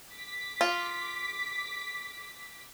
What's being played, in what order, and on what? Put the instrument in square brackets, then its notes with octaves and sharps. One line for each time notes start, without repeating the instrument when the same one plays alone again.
[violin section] D6 B6
[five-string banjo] F4